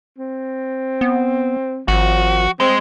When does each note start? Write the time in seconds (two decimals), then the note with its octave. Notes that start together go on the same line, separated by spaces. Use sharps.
0.18 C4
1.01 B3
1.88 G#1 F3 F#4
2.60 G#3 C4